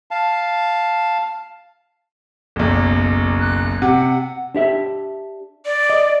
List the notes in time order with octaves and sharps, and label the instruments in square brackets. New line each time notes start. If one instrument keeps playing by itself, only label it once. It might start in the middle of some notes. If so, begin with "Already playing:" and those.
[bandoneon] F5 A5
[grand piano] F#1 B1
[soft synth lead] F#6
[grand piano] C3 [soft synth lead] F#5
[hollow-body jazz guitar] D4 G4 E5
[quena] D5
[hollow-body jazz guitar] D#5